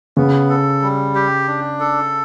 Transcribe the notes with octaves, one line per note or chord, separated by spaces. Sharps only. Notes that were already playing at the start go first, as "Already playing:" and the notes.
C#3 B3
A4
G3
G4
D4
A4